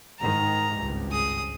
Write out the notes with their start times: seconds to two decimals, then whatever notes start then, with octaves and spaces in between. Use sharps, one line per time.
0.19 G#2 D#3 A#5
0.75 G#1 C#2 G2
1.11 G#4 D#6